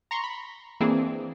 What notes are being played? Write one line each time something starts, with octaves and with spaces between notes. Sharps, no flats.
A#5 C6 C#6
B5
E3 A#3 C4 D4 G#4